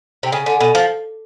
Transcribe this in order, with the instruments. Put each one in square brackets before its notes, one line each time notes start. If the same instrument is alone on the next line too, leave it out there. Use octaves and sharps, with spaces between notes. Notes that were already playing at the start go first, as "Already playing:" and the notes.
[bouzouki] C3 [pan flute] G5
[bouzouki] C#3 [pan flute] G#5
[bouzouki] D3
B2
[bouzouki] F3 [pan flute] F5